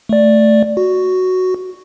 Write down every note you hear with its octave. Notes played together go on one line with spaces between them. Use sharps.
A3 D5
F#4